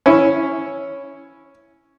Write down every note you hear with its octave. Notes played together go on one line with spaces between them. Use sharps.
C#4 E4